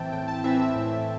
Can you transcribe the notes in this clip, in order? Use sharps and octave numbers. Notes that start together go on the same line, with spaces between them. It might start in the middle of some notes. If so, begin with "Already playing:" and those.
Already playing: A2 E3 C4 E5 G5 A5
A2 G5
A5
E3 C4 E5
E5
A2